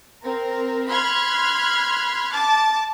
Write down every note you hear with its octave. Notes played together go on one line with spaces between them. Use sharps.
C4 A#4
B5 C6 F6 F#6 G#6
A5 D6